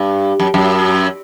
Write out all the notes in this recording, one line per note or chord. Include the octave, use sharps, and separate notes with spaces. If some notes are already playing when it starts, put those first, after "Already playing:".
Already playing: G2
F#2
F#2